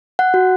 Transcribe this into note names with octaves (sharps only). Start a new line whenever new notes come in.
F#5
F#4